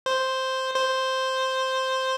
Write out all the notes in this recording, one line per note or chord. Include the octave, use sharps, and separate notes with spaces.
C5
C5